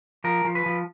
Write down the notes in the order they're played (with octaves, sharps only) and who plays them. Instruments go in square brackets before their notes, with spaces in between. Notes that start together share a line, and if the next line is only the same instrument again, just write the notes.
[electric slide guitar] F3 A#4
F3
B4
F3